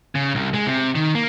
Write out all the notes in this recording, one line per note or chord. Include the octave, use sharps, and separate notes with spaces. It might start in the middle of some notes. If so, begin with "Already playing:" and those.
C#3
C2
G#3
C3
D#3
A#3